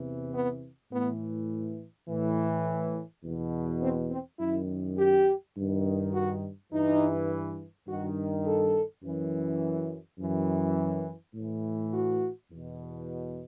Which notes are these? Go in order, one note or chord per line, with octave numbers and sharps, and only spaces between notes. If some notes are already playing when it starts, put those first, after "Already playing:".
Already playing: E2 C3 E3
B3
A2 E3 B3
A2 E3
E2 B2
C4
C4
F#2 D#3 E4
G4
G2 D#3
F#4
G2 E3 D#4
G2 D#3 F#4
A4
F#2 E3
F#2 E3
A2 E3
F#4
E2 B2